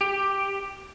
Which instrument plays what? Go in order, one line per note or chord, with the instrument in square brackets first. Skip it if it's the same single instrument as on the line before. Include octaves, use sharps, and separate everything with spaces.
[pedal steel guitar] G4